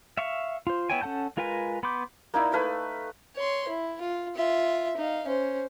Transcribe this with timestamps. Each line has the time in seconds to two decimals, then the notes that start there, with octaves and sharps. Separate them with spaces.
0.18 E5 F5 C#6
0.67 F4 C5
0.90 B3 E4 C#5 G5 G#5
1.01 C#4 A4 F#5 A5 G6
1.37 G#3 F4 A#4 B4 G#5
1.83 B3 B5 C6 D6 G6
2.34 A#3 D#4 E4 D5
2.52 A3 B4 F5 C#6
3.36 C#5 C6
3.68 E4
4.01 F4
4.36 F4 E5
4.97 D#4 F5
5.27 C#4 C5